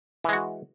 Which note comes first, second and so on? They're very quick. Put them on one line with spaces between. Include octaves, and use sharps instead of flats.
E3 G#3 F#4